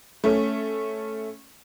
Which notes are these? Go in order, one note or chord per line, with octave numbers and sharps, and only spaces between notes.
A3 C#4